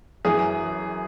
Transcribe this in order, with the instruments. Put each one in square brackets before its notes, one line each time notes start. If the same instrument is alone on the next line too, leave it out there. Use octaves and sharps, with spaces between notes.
[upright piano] F#2 E3 G#4